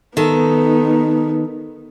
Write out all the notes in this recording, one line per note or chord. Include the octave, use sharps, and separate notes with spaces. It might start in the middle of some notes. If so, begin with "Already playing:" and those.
D#3 B3 D#4 A4